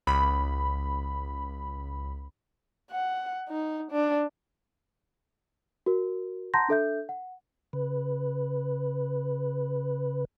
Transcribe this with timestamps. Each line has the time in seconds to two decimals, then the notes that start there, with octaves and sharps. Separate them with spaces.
0.07 C#2 B5
2.91 F#5
3.49 D#4
3.91 D4
5.86 F#4 A#4
6.54 F#5 A5 A#5 C6 G6 A#6
6.69 D4 A4 E5 G6
7.09 F#5
7.73 C#3 B4